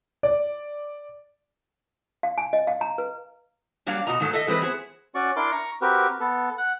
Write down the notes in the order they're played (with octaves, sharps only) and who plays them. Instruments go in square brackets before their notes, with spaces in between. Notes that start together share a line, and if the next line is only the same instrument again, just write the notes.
[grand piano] D5
[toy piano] F5
G#5
D#5
F5
A#5
B4
[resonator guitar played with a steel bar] F#3 G3 A#3 D4 C#5 F5
B2 F#4 D#5 A#5
G#2 D#3 F#3 A3
A4 D#5 E5
E3 G#3 C4 E4 B4
B3 G#4 C5
[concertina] C#4 F#4 D5 C#6
D4 E4 A#4 C6 D6
A#5 C#6
C4 F#4 G4 A#4 B4
B3 A4
F#5